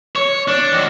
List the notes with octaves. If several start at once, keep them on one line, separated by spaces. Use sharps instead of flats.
C#5
D4
D#3 F#4